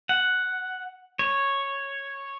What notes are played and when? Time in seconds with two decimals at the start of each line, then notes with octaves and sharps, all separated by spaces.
0.09 F#5
1.19 C#5